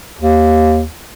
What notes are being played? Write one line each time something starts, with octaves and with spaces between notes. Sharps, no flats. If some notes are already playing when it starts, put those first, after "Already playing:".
D#2